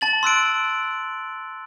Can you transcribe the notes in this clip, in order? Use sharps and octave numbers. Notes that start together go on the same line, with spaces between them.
A5 A6 F#7
C6 E6 F#6 D7